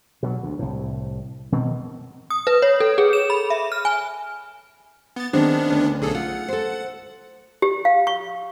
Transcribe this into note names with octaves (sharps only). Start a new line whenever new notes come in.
B2 F3 F#3
D2
C2 A2
B2 D#3 C4
D#6
B4
C#5
A4
G#4
E7
B5
E5
F6
G#5
B3 A6
D#3 B3 C4 D4 G#4
D2 C#4
B1 G#4 A4
F4 F#5
A4 C5
G4
F5
C#6